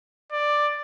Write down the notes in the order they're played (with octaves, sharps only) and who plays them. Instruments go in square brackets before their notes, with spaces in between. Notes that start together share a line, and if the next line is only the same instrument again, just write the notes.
[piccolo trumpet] D5